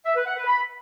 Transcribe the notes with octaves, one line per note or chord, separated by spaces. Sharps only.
E5
B4
F#5
B4
B5